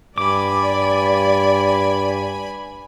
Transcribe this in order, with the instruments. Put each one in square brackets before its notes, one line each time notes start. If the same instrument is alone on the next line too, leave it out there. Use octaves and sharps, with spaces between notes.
[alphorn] G2 [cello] D5 [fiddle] G#5 B5 [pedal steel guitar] D6